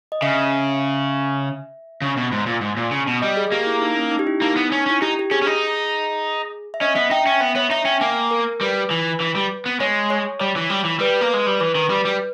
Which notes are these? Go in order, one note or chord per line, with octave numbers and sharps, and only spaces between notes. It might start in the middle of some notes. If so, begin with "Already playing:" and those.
D#5
C#3 E5
C#3
B2
G#2
A#2
G#2
A#2
C#3
B2
G3 D#5
G#4
G#4
A#3 G4
E4
D#4
C#4
D#4
G4
E4
A#3 D#4
B3
C#4
C#4 E4
D#4 G4
G4
C#4 G#4
C#4
D#4
E5
C#4 D#5
B3 E5
D#4 G5
C#4 E5
B3 E5
B3 C#5
D#4 E5
C#4 G5
A#3 G#5
A#4
G3 B4
E3
E3
G3
B3
G#3 C#5
C#5
G3 C#5
E3
G3
E3
G3 B4
A#3
G#3
G3
E3 B4
D#3
G3
G3